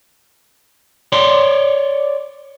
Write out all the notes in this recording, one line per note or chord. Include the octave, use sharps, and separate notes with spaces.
C#5 D5 C6